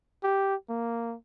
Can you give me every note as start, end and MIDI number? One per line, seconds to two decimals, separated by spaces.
0.23 0.55 67
0.69 1.16 58